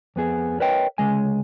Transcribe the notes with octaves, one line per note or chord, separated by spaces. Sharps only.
F2 B3 G#4
A#4 B4 C#5 D#5 G5
D2 C#3 G#3 G#5